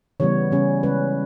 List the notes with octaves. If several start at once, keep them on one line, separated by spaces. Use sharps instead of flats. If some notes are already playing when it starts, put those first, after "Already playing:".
C#3 E3 G3 B3 C#5
C#3 G3 C#4
C#3 G#3 C#4 B4